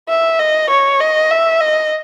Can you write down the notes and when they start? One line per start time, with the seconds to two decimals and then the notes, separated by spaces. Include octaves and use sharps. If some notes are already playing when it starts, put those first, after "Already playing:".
0.09 E5
0.39 D#5
0.70 C#5
1.01 D#5
1.31 E5
1.61 D#5